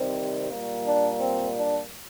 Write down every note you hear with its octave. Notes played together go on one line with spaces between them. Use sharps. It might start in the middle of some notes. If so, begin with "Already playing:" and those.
Already playing: C3 D#3 G3 C4
A#2 G3 A#3
D4
C4
D4